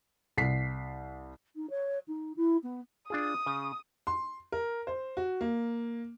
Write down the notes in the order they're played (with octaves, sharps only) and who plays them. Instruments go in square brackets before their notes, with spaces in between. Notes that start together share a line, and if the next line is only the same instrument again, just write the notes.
[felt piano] C2 B6 C7
[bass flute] D#4
C#5
D#4
E4
B3
[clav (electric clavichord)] D4 F4 G#4 [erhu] D#6
[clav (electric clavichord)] C#3
[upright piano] C6
A#4
C5
F#4
A#3